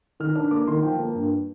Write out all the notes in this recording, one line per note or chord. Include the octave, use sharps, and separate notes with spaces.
D#3 F6
D4 F6
A#3 D6
D#3 C6
F3 G5
A#3
G2